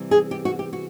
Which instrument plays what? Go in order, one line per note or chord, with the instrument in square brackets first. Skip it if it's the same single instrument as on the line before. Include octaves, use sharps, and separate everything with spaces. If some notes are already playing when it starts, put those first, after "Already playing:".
Already playing: [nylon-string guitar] C3 E3 G3
G#4
G4
F#4
G4
F#4